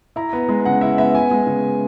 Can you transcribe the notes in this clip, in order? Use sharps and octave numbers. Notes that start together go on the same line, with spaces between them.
E4 A#5
B3
G#3
C#3 F#5
E4 E5
B3 E5
B3 G#5
G#3
C#3